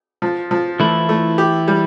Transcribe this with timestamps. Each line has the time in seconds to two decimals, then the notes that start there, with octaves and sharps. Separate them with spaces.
0.22 F3
0.51 F3
0.80 E3 A3 E4
1.09 A3
1.38 G4
1.68 G3